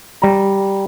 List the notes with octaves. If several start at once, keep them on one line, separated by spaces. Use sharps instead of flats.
G3 A#5